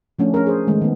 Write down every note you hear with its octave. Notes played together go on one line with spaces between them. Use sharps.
F3 A3 C#4 D4
C#4 G#4 A#4
G#4 C5
D#3 G#3 A3
D#3 B3